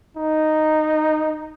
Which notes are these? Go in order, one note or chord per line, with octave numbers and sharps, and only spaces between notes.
D#4